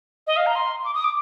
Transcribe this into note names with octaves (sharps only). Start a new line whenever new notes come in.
D#5
F5
A#5
C6
D6
D#6
D6